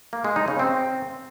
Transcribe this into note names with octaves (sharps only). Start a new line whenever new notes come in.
A#3
G#3
D#4
C#3
C4